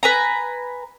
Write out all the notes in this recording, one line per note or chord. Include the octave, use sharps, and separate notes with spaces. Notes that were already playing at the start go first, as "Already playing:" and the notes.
B4 G#5 A#5